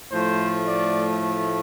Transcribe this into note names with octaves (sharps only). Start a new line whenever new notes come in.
A2 F3 A3 C5
D5